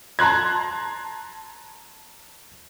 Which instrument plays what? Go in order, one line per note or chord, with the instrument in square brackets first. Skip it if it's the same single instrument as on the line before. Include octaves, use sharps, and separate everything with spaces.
[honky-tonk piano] A5 A#5 C6 F#6 G#6